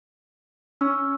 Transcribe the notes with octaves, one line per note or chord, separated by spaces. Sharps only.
C#4 C#6 E6 F6